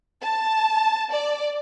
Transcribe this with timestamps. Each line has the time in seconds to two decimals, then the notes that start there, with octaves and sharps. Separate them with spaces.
0.22 A5
1.12 D5